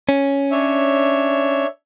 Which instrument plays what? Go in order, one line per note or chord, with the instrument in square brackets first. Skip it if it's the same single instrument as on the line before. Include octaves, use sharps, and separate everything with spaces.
[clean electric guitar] C#4
[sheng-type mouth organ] D4 C#5 E5